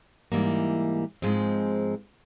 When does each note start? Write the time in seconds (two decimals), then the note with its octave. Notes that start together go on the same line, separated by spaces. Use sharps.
0.32 G#2 E3 G3 A#3
1.22 G#2 F3 G#3 C4